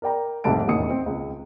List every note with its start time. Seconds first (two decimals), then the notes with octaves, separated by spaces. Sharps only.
0.02 A#4 D5 G5 A#5
0.44 F1 C2 G#2 A3 A5 D7
0.67 E1 A1 D#2 D#3 D#6 C#7
0.90 C4
1.06 C#2